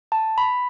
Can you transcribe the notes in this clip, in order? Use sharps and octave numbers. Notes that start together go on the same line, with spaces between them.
A5
B5